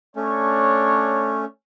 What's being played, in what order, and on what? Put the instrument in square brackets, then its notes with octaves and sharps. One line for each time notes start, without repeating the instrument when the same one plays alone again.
[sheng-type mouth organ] A3 C#4 [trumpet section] D4 C#5